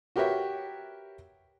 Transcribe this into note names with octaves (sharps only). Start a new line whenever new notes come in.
F#4 G4 A#4 B4 C#5 E5